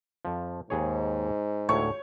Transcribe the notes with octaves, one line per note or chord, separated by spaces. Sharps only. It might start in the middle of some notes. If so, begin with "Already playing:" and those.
F2 F3
D#2 G#2 G#4 C#5
D2 A2 C#5